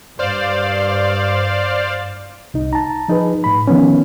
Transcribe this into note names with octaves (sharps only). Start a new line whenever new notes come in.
G2 C5 D5 F5
C2 D#4
A5 A#5
F3 D#4 G#4 B4
A2 B5
D#3 F3 B3 C#4